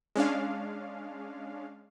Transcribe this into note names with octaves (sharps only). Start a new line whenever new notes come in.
G#3 C#4 D4 F5